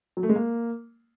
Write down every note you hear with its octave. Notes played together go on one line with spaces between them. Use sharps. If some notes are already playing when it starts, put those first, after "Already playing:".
F#3
A3
G#3
A#3